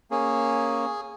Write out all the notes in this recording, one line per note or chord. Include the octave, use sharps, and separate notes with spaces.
A#3 C#4 G#4